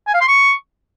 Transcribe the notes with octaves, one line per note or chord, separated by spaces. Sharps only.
G#5
F5
C6
C#6